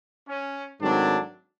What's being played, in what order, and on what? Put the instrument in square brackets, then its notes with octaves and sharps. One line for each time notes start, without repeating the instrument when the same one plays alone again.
[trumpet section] C#4
[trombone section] G#2 D#3 F#3 A3 C4 [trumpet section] D4